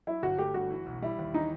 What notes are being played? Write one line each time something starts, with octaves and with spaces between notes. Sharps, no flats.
F#3 E4
G1 F#4
A3 G4
G2 F#4
E3
B1
G3 E4
D#2
E3 D#4